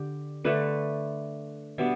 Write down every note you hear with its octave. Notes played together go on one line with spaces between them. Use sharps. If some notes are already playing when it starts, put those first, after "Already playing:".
Already playing: D3 G4
D3 A3 D4 B4
B2 G3 B3 D4 E5